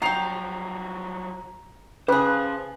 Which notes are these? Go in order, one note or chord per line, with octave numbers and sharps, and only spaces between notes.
F3 F#3 F#4 G4 A#5 C7 F7
C#3 G4 G#4 B4 C5 F5